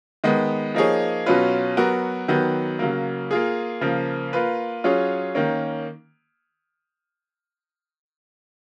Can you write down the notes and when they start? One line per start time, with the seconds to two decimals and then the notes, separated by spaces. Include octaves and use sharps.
0.24 D#3 G#3 B3
0.74 F3 A#3 D#4 G#4 C#5
1.26 B2 F#3 C#4 F4 B4
1.77 F#3 B3 F#4 A#4
2.28 D#3 F#3 B3
2.79 C#3 F#3 A#3
3.31 A#3 F4 G#4
3.81 C#3 F3 A#3
4.33 A#3 F4 B4
4.84 F#3 C#4 F4 G#4 C#5
5.35 D#3 A#3 C#4